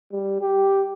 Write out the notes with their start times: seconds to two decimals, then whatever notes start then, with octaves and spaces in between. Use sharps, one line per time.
0.12 G3
0.41 G4